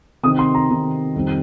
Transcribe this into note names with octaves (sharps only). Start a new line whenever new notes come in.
C3 D#3 C4 D#6
C6
A#5
C3 D#3 C4
F2 D#3 G3 C4